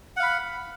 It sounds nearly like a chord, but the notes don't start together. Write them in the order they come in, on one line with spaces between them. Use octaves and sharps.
F#5 F5 B5